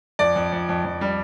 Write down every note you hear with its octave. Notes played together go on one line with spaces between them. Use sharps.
F2 D5
F2
F2
F2
F2
G3